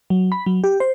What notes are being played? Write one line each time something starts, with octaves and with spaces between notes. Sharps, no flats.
F#3
B5
F#3
G4
C5